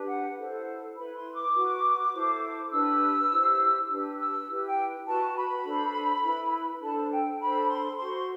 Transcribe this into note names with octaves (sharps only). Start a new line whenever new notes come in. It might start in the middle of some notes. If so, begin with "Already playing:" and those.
Already playing: D4 G4 B4
F#5
E4 A4 C5
E4 B4 B5
C6
D6
F#4 B4
E4 A4 C5
D4 G4 B4 E6
E4 G4 C5
D4 G4 B4
E6
E4 G4 B4
G5
F#4 B4 A5
B5
D4 A4 C5
E4 B4
D4 A4 C5 A5
G5
D4 A4 C5 B5
C6
F#4 C5 C6